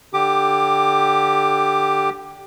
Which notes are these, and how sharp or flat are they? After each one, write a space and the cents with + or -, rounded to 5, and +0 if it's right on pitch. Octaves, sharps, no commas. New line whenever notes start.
D3 +0 G4 +0 D6 +20